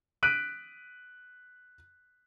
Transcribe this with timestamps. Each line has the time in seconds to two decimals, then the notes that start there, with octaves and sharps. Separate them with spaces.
0.23 F#6 B6 D7 D#7